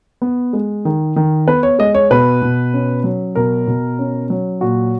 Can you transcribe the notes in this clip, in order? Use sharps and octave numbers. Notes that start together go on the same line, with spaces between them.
B3
G#3
D#3
D#3
B3 B4
C#5
G#3 D#5
C#5
B2 B4
B2
C#4
F#3
B2 A#4
B2
C#4
F#3
A#2 F#4